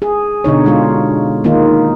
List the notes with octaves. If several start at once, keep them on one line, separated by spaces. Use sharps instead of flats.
G#4
B2 D3 D#4 C#5
B2 G#3 F4
D#3 A#3 D#4 F4